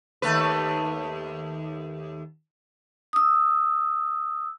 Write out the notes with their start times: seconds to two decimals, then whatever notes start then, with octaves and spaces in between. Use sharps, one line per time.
0.22 D#2 A3 B4
3.13 D#6 E6